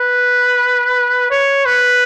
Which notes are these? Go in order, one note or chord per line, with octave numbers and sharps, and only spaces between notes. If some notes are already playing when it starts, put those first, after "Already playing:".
Already playing: B4
C#5
B4